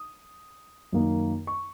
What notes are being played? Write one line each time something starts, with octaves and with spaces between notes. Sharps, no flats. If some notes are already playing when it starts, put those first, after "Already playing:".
Already playing: D#6
F#2 D#3 A#3
C#6